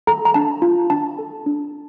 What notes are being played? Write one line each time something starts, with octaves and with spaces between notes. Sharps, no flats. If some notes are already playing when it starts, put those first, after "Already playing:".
A4 A#5
A#5
D4 A5
F4
D4 A5
A4
D4